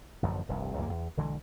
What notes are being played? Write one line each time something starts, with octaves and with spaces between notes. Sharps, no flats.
A1 F#2 D3 F3
F1 C2 G2
C#2 F#2 G3 A#3
E2
B1 D3 E3 G#3